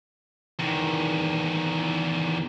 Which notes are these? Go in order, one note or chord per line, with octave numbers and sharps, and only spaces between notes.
E2 D#3